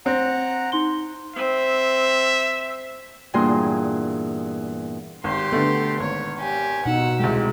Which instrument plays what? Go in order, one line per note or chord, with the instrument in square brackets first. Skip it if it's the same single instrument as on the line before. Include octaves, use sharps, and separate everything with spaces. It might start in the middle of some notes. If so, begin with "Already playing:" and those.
[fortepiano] C4 [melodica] F#5 A#5
[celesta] D#4 C6 G7
[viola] C4 [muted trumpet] E5
[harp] E2 G2 A#2 A#3 G#4 C6
[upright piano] G#1 [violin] G4 C6
[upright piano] D3 A3 [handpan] B3
[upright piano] G#1 [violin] C#5
[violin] G4 G#5
[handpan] B2 D#4 [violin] F#5 E6
[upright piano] D#1 C2 [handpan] G#3 [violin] G4